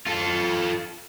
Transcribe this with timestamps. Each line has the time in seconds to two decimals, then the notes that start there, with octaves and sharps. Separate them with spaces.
0.07 F4 A4